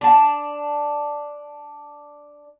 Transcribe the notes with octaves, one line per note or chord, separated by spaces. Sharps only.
D4 A5